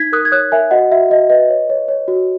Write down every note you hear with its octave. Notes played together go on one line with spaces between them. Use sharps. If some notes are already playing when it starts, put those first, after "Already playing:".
Already playing: D#4 G#6 B6
A#4 D#6 F#6
G#6
C#5 D#6 F#6
A#4 E5 G#5
F#4 D#5 F#5
F#4 E5
F#4 D#5
B4 D#5
C#5
C#5
C#5
F#4